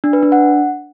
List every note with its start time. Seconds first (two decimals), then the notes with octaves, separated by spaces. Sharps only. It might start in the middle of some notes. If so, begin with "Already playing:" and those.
0.04 D4
0.13 B4
0.23 D4
0.32 F#5